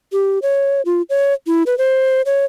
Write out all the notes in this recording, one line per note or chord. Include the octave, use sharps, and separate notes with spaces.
G4
C#5
F4
C#5
E4
B4
C5
C#5